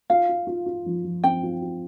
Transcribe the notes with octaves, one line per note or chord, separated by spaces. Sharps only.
F4 F5
F4
F4
F4
F3
F3
C4 G5
F4
F4